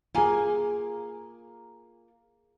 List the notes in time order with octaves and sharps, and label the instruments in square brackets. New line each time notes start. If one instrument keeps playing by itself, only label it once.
[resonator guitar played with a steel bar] A#3 G#5 [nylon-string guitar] F4 G#4